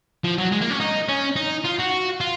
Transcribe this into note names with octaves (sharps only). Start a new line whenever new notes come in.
F3
F#3
G#3
A#3
C#4
D#4
C#4
D#4
F4
F#4
F4